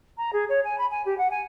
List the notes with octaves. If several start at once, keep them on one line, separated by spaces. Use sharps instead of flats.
A#5
G#4
C#5
G#5
B5
G#5
G4
F#5
G#5